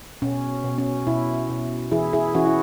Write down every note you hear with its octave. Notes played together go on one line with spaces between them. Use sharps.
B2 C#4
B2
C#4
B2 E4
B2
E3 E4 G#4
E4 G#4
E3 C#4 F#4
E4